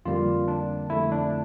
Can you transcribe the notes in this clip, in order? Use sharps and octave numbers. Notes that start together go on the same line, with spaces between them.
F2 D3 G3 A#3 F4
D4
F2 D3 A3 E4
D4